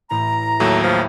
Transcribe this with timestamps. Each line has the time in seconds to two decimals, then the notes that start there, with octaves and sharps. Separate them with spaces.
0.11 A1 A2 A#5
0.60 D#2 A2 F#3 A3
0.83 F3 B4 E5 G5